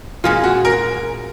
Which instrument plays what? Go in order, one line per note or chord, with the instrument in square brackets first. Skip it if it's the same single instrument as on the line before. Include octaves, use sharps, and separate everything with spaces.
[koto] A#2 G#3 C#4 [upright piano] F4
[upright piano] F#4
A#4